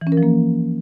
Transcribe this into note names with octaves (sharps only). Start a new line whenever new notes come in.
E3
C#4
A#4
F3
A#3